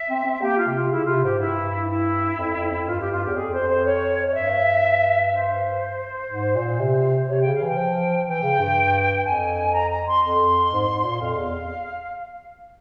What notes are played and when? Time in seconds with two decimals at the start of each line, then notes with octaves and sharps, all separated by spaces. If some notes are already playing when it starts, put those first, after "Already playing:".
Already playing: E5
0.10 C4
0.25 C4
0.42 A#3 G4
0.58 F4
0.67 C3
0.74 F4
0.91 C#3 E4
1.07 C3 F4
1.23 G#2 G4
1.39 G2 E4
1.89 E4
2.37 F2
2.54 F2
2.70 F2
2.87 G2 F4
2.99 G4
3.12 F4
3.23 E2 G4
3.36 F2 G#4
3.53 C5
3.60 F2
3.69 C5
3.85 C#5
4.28 C#5
4.34 G2 E5
5.32 C5
6.31 G#2
6.56 A#2
6.79 C3
7.29 C3 C#5
7.41 C#3 G5
7.53 F5
7.61 E3
7.66 G5
7.77 F3
8.27 E3 G5
8.43 C#3
8.60 G2
9.24 F2 G#5
9.75 A#5
9.90 A#5
10.07 C6
10.23 F2 C6
10.73 G#2
10.88 G#2
11.04 A#2
11.21 F2 F5
11.37 E2